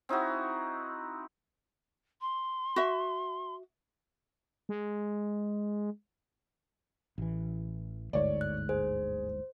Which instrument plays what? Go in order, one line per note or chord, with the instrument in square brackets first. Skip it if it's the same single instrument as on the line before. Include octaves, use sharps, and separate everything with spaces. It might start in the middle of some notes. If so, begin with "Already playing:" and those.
[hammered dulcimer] C4 D#4 E4 F#4
[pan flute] C6
[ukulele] F#4 E5
[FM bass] G#3
[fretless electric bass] A1 E3
[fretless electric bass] G1 D2 G#2 [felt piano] C#5 D5
[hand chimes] F#6
[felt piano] G#4 [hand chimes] C5